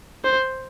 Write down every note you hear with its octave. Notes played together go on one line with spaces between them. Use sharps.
C5